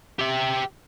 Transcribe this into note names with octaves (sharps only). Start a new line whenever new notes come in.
G4 E5